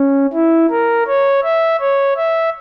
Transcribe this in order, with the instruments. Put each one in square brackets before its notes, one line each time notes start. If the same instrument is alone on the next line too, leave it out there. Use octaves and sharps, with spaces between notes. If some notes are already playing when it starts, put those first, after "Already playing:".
Already playing: [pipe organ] C#4
E4
A#4
C#5
E5
C#5
E5